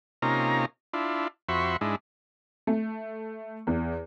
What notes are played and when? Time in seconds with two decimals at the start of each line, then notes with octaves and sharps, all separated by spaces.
0.22 C3 A#3 C#4 D#4 F4 A#5
0.94 D4 E4 F4
1.49 F2 F#4 C5 E5 B5 C#6
1.81 G#2 G#3 D4 E4
2.67 A3
3.67 E2